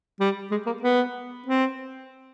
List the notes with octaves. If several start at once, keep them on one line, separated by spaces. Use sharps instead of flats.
G3
G#3
A#3
B3
C4